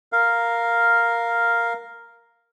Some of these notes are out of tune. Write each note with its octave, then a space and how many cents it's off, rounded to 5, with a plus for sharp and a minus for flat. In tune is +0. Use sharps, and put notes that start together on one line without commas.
A#4 +0 F5 +0